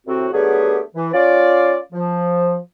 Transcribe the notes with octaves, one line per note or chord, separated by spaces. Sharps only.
A2 C3 C4 F#4
F#3 A3 B3 D4 G4 G#4
E3
C#4 F4 D5
F3